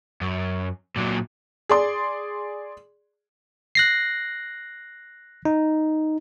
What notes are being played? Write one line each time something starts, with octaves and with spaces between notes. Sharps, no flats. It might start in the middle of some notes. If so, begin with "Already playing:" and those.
F#2
A#2 F#3
G#4 D5 C6
F#6 A#6 C7
D#4